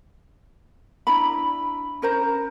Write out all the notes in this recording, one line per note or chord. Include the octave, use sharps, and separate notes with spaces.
D4 E4 A#5 B5
C#4 A#4 C5 A#5